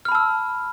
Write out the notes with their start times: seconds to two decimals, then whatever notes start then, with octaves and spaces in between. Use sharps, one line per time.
0.05 F6
0.09 B5
0.12 A5
0.15 E6